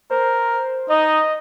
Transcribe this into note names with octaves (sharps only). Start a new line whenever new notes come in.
A#4 C5
D#4 D#5